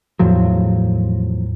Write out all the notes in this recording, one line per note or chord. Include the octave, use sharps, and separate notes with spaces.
E2 A2 F3 F#3